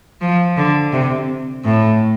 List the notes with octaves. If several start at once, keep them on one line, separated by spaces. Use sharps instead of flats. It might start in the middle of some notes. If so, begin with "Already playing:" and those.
F3
D3
C3
A2